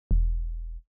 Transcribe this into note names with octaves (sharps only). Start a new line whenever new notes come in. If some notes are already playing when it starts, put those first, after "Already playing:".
E1